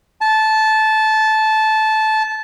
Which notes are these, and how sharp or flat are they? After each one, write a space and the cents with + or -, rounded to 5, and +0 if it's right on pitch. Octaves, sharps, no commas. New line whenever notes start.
A5 -15